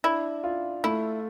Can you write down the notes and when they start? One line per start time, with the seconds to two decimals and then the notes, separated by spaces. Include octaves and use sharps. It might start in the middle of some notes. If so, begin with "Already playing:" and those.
0.04 D4 E4
0.44 F4
0.84 A3 E4